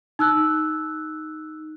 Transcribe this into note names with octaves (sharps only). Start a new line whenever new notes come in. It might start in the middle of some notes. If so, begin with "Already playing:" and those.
D#4 E6 F#6